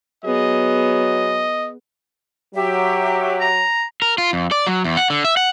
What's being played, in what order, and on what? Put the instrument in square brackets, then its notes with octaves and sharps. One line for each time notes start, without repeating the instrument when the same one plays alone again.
[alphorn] F#3 [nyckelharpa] B3 G#4 [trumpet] D#5
[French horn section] F#3 [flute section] G4 E5
[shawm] A#5
[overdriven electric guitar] A#4
F4
F2
D5
F#3
E2
F#5
D3
E5
F#5